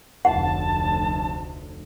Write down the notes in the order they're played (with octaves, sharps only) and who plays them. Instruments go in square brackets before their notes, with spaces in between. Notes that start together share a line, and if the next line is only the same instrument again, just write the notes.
[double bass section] F1 D2 [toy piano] F#5 [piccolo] A5